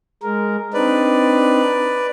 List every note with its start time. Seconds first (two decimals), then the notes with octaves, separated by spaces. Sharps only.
0.23 G#3 A#4
0.74 C4 D4 D#4 B4 D5